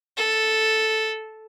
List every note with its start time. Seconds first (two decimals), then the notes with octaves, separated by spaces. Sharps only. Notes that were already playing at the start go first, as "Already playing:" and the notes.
0.17 A4